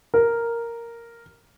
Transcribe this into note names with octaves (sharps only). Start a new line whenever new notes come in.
A#4